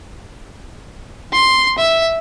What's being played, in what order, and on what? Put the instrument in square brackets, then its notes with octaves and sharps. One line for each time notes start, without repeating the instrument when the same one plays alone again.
[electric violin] C6
E5